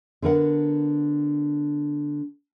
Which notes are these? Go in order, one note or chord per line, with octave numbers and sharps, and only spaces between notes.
D3 B3 A#4 F#5